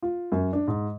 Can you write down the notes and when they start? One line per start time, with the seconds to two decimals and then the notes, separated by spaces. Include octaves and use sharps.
0.03 F4
0.32 F#2
0.53 D4
0.68 G#2